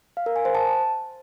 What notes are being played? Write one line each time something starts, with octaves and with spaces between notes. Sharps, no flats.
F5
A#4
G#5
C5
A5